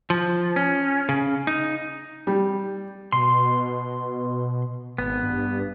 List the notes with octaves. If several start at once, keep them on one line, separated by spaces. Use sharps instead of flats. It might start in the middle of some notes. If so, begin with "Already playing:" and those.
F3
C#4
C#3
D#4
G3
B2 C6
G#1 B3
G2